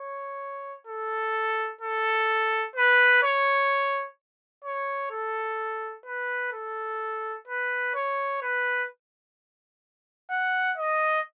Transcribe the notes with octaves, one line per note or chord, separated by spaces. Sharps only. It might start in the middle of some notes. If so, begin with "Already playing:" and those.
Already playing: C#5
A4
A4
B4
C#5
C#5
A4
B4
A4
B4
C#5
B4
F#5
D#5